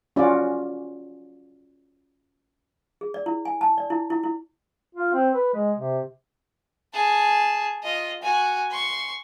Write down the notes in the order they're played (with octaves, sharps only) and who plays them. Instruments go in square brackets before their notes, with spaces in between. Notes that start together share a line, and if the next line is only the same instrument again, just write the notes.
[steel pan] C#4 F4 F#4 D5
[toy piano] G#4
D5
E4
G#5
A5
D5
E4
E4
E4
[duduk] F4
C4
B4
G#3
C3
[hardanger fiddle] G#4 A5
F4 D#5
F#4 G#5
C6 C#6